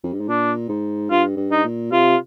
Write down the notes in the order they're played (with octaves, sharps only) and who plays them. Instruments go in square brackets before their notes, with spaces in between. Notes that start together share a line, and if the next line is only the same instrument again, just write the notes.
[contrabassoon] F2
G2
G#2
[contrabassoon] A#2 [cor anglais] D4
[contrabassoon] G#2
[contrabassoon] G2 [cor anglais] F4
[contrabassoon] G2
[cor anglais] D#4
[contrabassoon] A#2
[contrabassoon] C3 [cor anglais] F4